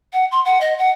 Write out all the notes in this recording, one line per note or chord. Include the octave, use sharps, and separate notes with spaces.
F#5
C6
F#5
D#5
F#5